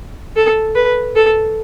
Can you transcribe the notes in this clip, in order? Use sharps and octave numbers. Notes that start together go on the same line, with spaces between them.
A4
B4
A4